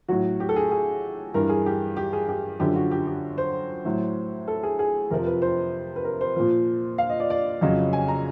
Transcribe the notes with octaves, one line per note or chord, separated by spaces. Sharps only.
A2 F#3 F#4
G4
A4
G#4
G#4
G2 E3 A#4
G#4
G4
G4
G#4
G4
F#2 D3 F3 G4
F#4
G4
G4
C5
A2 F#3
A4
G#4
G#4
F2 C3 F3 A#4
B4
C5
B4
A#4
C5
A#2 F3
F5
D#5
D5
D5
F2 C#3 F#3 D#5
G#5
A#5